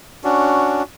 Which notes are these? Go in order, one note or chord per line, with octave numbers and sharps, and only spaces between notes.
C#4 D4 F#4